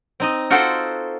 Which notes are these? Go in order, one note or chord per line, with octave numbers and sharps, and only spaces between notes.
C4 D#4 D#5
F4 F#4 A4 C5 F#5 G5